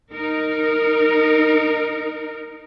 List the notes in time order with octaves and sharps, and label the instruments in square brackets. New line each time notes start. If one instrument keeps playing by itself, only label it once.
[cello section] D#4 A#4